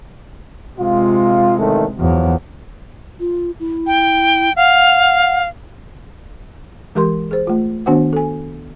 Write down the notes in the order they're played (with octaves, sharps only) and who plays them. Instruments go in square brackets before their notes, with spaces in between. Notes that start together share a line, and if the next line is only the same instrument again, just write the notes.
[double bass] C3 G#3 [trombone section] F4
[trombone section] A1 D#3 A3
[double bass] E2 [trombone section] F3 F#3 F#4
[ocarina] F4
E4
[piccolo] G5
[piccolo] F5 [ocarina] F#5
[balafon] E3 G#3 G4 A#4 C6
G#4 C5
A3 F4
D#3 B3 D4 F#4 C5 F#5
A4 G#5